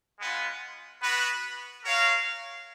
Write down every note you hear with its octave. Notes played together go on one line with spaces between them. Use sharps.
G#3 B3 F4
B3 F#4 B4
F#4 A#4 C#5 F5